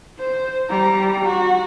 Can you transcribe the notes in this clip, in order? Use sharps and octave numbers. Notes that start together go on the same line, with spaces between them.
C5
G3 A#5
F#4